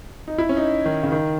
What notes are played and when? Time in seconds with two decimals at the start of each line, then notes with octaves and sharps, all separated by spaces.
0.28 D#4
0.38 E4
0.49 C#4
0.57 D#4
0.85 D#3
1.03 C#3
1.12 D#3